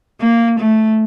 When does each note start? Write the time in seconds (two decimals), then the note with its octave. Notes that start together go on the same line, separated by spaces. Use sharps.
0.20 A#3
0.60 A3